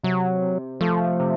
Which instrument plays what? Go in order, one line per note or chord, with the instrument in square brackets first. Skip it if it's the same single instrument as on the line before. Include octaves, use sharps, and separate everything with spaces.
[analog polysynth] C3 [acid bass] F#3
[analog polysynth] C3
[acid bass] F3 [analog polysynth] A3
[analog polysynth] C3